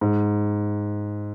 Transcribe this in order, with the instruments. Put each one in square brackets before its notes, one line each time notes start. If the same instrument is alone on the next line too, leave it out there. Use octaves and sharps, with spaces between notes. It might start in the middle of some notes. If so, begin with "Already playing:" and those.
[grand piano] G#2